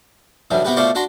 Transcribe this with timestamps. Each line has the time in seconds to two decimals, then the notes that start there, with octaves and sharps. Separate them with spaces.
0.51 B1 F#2 D3 E3 G3
0.65 C3 B3 F#4 G4 B4
0.77 B2 A3 F4 C5 D5 C#6
0.95 D4 F#4 A#5 C6